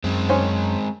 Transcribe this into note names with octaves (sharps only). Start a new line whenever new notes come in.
F#2 G#3 C4
C#4 C5